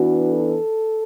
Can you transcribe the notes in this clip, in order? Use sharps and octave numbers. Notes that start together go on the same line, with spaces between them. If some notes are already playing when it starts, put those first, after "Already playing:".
Already playing: E3 B3 D4 F#4
A4